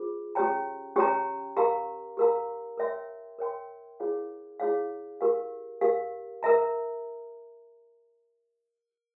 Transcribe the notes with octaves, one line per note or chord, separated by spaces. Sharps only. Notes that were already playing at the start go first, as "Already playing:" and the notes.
Already playing: F4 G#4 C5
C#4 G4 C#5 G5 A#5
C#4 G4 C#5 G5 A#5
G4 A#4 F5 A#5
G4 A#4 F5 A#5
A#4 C#5 E5 G5 C6
A#4 C#5 E5 G5 C6
E4 G#4 C#5 F5
E4 G#4 C#5 F5
G4 A#4 F5
G4 A#4 F5
A#4 E5 A#5